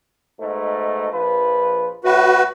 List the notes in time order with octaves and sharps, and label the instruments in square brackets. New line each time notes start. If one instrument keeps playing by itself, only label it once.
[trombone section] G#2 B2 A3
A#1 F3 B4
[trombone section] A2 [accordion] F#4 B4